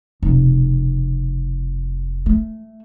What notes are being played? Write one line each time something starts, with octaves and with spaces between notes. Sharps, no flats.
F1 B2
A3